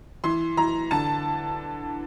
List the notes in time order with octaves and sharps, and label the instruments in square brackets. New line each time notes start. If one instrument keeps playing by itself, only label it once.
[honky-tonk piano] E3 C6
E3 A#5
D3 A5